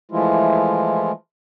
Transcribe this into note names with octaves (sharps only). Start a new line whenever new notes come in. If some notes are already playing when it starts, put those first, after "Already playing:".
E3 F3 G#3 A3 E4 F4